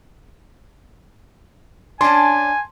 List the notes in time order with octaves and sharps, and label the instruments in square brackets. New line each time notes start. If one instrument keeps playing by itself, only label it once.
[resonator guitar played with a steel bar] C#4 D4 [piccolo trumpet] G#5 [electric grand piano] A5 C6